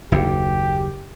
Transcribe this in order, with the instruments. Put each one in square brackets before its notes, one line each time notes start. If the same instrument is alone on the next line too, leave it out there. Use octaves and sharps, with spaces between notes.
[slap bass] F#1 D#2 [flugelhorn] G4